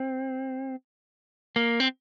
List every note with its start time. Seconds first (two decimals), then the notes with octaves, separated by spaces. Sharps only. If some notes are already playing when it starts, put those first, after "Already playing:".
Already playing: C4
1.56 A#3
1.80 C4